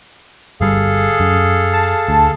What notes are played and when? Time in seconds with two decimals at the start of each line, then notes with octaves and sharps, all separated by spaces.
0.61 G1 G3 G#4 A4 F5
1.20 F#2
1.73 A5
2.08 D2